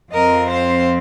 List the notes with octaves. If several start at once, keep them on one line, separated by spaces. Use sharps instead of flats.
F2 F3 C4 A#4 D#5
C5 F5